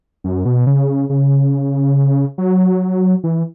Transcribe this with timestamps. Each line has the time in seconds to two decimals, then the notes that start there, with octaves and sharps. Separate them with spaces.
0.24 F#2
0.45 B2
0.67 C#3
1.09 C#3
2.38 F#3
3.24 E3